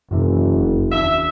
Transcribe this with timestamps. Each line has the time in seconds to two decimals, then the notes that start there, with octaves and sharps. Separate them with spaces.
0.11 F#1 F#2 C3 E3
0.55 F1
0.92 D#2 D4 E5